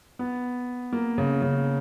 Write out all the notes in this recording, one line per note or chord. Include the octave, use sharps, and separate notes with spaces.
B3
A#3
C#3
C#3